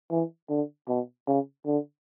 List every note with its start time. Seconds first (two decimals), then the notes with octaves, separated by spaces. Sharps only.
0.11 E3
0.50 D3
0.88 B2
1.27 C#3
1.66 D3